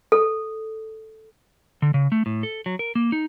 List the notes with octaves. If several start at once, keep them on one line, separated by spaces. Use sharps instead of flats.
A4
D3
C#3
A3
A2
A4
F#3
A#4
A#3
D#4